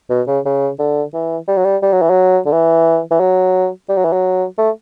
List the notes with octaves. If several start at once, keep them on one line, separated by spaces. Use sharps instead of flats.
B2
C#3
C#3
D3
E3
G3
F#3
G3
G3
F#3
E3
F#3
D3
E3
E3
F#3
G3
F#3
E3
F#3
A3